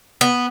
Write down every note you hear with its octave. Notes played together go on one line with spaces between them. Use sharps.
B3